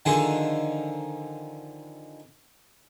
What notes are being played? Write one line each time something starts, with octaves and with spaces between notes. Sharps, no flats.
D3 D#3 F3 D#4 G#4 A4